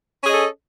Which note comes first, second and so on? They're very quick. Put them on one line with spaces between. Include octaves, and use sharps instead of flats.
C#4 G#4 D#5 A4